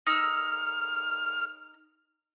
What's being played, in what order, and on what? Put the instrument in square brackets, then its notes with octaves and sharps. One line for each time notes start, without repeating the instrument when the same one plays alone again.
[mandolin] D#4 E6 [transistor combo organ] F6